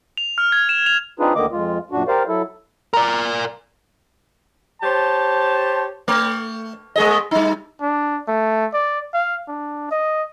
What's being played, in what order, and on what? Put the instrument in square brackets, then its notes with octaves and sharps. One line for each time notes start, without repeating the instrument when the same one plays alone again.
[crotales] F7
F6
G#6
E7
F7
[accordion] C4 D4 D#4 F4 G#4 B4
D2 D3 D#3 A#3 D#5 D6
F2 G#3 F4
F#2 A#2 D4 F#4
G4 A#4 C5 D5 F5
F#3 E4 A4
[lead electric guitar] A#4 D5 [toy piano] A#5 D6
[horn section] G4 C5 C#5 A5
[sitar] A3
G#3 G#4 D#5
G3 D#4
[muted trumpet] D4
A3
D5
F5
D4
D#5